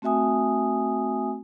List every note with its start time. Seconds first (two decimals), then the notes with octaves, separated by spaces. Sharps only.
0.02 A3 C4 F#4 E5 G#5 D#6